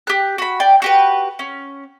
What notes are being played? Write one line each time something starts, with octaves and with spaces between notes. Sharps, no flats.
G4 F#6
F#4 B5
D5 G5
F#4 G4 B4
C#4